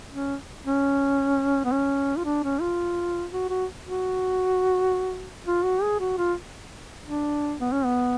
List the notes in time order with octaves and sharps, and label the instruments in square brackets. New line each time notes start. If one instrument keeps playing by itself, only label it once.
[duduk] C#4
C#4
B3
C#4
F4
D4
C#4
F4
F#4
F#4
F#4
F4
F#4
G#4
F#4
F4
D4
B3
C#4
B3